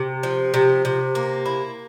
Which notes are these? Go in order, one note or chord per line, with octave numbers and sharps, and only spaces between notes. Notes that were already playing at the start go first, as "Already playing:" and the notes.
Already playing: C3
F3
C3
C3
A#3
E4